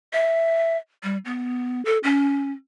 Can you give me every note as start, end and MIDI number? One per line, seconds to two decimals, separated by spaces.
0.13 0.77 76
1.03 1.18 55
1.25 1.84 59
1.85 1.98 69
2.04 2.52 61